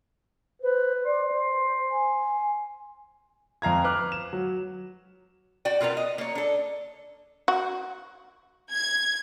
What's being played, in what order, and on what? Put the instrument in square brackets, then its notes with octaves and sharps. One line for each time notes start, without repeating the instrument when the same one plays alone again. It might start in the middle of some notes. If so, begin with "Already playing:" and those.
[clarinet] B4 [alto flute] C5
[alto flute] D5 [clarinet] C6
[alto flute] C5
G#5
[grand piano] F2 F5 A#5 G#6
B4 D6 F6 F#6
E7
F#3
[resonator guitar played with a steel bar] F#4 D5 G5
B2 F4 A#4 B4
D#5
A#3 C#5
D4 A4
[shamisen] F#4
[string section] G#6